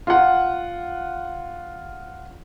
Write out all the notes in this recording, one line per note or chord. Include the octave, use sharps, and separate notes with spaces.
F4 F#5